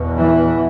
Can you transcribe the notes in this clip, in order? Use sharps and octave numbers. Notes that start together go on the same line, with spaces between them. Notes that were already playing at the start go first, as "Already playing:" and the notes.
Already playing: E2 B2
E3